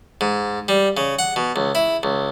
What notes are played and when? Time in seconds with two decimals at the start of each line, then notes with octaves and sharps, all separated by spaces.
0.21 G#2
0.68 G3
0.97 C#3
1.19 F#5
1.36 B2
1.56 C#2
1.75 E4
2.03 C#2